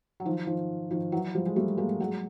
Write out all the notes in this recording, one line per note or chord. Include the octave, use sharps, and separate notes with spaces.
F#3
D#3 F3
D#3 F3
D#3 F3
E3 F#3
F3 G3
G#3
G3 A3
G#3 A#3
F#3 G#3